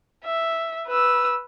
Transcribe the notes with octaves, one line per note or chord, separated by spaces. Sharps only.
E5
B4 E6